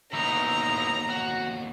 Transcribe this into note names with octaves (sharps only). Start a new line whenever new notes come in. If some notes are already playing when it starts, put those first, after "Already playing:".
D#2 B2 B3 D#4 E4 A#5
F#4